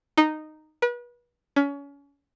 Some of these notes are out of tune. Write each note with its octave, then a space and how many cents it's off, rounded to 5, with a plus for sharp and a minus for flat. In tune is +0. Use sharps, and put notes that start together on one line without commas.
D#4 -10
B4 -35
C#4 +30